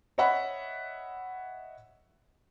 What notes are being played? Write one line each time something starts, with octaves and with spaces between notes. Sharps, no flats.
C#5 D#5 E5 F#5 B5